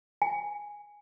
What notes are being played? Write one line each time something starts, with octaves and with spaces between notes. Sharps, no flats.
G#5